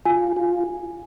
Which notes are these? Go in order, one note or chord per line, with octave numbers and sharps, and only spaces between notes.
F4 G#5
F4